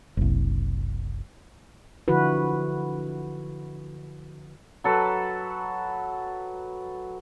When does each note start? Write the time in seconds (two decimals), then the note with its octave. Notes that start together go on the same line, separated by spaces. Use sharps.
0.17 F#1 C2
2.08 D3 F3 E4 F#4 B4
4.84 F#3 A4 B4